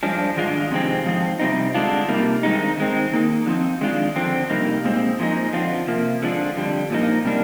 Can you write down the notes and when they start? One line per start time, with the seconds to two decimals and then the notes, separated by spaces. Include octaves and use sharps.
0.03 G2 F3 G#3 D4
0.36 G#2 D#3 G#3 D4 F4
0.71 F2 C3 D#3 G#3 C4
1.06 G#2 F3 C4
1.40 C3 G3 C4 D#4
1.74 D3 G#3 D4 F4
2.08 C3 G3 A#3 D#4
2.43 G2 D#3 G#3 C4 D#4
2.77 D#3 G#3 C4
3.12 D#3 A#3 D#4
3.46 D3 F3 C4 D#4
3.81 D#3 G#3 D4 F4
4.16 F2 D3 F3 C4
4.50 F2 C3 G3 A#3 D#4
4.84 A#2 G#3 C4
5.19 A#2 F3 G#3 D#4
5.53 D3 F3 C4 F4
5.87 C3 F3 A#3
6.22 D3 F3 G#3 D4 F4
6.56 F2 D3 G3
6.90 A#2 F3 A#3 D#4
7.25 C3 G3 A#3 D4